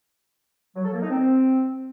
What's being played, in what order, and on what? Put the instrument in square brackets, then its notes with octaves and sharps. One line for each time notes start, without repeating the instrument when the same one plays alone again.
[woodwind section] F#3
A4
A#3
D#4
C4